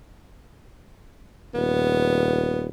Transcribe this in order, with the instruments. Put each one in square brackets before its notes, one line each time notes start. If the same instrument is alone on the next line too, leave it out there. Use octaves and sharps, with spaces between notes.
[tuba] D#1 [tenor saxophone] B3